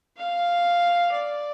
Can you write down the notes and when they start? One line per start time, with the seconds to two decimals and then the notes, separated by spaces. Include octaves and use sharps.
0.17 F5
1.12 D5